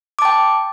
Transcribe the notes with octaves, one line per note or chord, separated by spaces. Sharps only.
G5 A5 D6